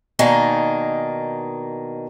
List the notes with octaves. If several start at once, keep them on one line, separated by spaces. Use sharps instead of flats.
B2 D#3 A#3 D4 D#4 G#5